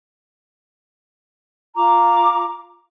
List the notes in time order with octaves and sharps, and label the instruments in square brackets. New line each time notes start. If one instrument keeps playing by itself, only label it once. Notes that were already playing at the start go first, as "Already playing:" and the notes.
[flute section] F4 A#5 D6